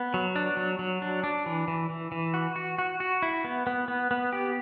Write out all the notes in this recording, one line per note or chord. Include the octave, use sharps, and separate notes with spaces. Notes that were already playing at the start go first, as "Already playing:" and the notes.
Already playing: B3
F#3
D4
F#3
F#3
D4
D4
E3
E3
E3
E3
F#4
F#4
F#4
F#4
E4
B3
B3
B3
B3
G4